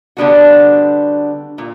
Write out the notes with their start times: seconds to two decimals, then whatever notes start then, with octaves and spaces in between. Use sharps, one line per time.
0.17 D3 G3 B3 D4 F#4
1.58 A#2